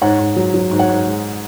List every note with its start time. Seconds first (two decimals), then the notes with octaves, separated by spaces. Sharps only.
0.02 G#2 C#5 F#5
0.19 G#2
0.37 F#3
0.54 F#3
0.71 G#2
0.79 C#5 F#5
0.89 G#2
1.06 G#3